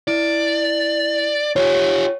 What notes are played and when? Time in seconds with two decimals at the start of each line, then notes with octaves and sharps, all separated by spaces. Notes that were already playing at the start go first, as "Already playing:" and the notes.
0.08 E4 D5
1.56 F4 G4 C#5